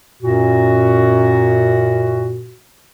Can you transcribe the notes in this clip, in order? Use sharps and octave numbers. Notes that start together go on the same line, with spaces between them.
F#2 A#2 F#4